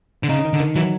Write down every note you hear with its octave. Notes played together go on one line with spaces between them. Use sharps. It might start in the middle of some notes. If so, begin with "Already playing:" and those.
D3
C#3 D#4
D#3
D3
D#3
E3 F#3